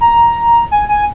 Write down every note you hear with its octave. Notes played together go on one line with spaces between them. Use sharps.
A#5
G#5
G#5